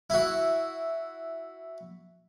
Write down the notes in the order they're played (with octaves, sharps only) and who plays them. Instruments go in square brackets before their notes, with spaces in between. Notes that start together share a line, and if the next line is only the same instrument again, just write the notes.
[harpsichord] E4 F#4